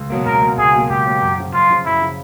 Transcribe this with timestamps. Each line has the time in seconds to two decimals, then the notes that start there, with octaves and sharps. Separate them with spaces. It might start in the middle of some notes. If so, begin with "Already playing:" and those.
Already playing: C#2
0.10 B2 F#3 A#3
0.26 C#2 A#4
0.42 B2 F#3 A#3
0.57 C#2 G#4
0.74 B2 F#3 A#3
0.90 C#2 G4
1.06 B2 F#3 A#3
1.22 F#2
1.38 C#3 F3
1.53 F#2 F4
1.70 C#3 F3
1.85 F#2 E4
2.01 C#3 F3